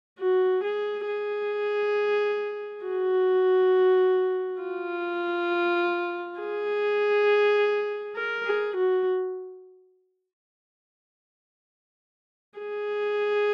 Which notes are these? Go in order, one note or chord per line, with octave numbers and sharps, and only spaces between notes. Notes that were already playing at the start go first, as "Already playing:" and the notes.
F#4
G#4
G#4
F#4
F4
G#4
A#4
G#4
F#4
G#4